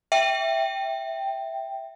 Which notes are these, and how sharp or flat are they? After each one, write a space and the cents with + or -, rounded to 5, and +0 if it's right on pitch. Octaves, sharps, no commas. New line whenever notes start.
E5 +0 G5 +0